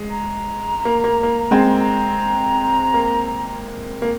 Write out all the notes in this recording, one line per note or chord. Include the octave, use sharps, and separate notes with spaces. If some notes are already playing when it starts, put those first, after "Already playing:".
Already playing: G#3
A#5
A#3
A#3
A#3
G#3 C4
A#5
A#3
A#3